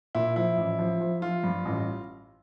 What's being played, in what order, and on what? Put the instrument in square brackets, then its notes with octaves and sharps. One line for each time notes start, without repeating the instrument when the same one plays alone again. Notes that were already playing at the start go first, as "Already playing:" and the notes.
[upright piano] A#2 [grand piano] E4
[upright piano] F3 [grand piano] E4
[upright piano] A1
F3
F3
[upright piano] F3 [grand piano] F4
[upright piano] G2
A1